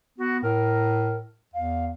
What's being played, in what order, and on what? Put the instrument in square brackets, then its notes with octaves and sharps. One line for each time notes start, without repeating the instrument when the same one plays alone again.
[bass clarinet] B3 [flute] F#4
[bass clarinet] A2 [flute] A#4
[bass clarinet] E2 [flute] F5